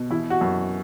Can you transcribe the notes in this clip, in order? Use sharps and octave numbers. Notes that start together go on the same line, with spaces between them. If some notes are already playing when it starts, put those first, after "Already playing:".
Already playing: B2
E3 E4
F#4
F#2